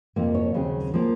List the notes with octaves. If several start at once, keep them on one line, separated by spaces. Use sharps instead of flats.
F2 C3 F3 A#3
C#5
D#2 C#3 F#3 C4
F3 A#3